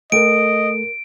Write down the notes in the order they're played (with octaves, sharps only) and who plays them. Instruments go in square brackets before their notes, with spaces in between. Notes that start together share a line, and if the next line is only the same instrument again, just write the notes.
[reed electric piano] A3 A4 [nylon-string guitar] A#4 G5 [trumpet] D#5 [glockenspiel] D7